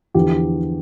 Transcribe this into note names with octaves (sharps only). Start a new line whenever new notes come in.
E2 D3 F3 G4